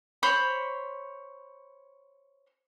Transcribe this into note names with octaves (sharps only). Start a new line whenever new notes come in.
C5 C#5 B5